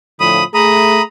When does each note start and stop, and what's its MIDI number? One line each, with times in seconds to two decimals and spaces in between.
0.20 0.42 45
0.20 0.42 50
0.20 0.42 53
0.20 0.44 83
0.20 0.44 87
0.54 1.01 57
0.54 1.01 68
0.54 1.02 82
0.54 1.02 83
0.54 1.02 87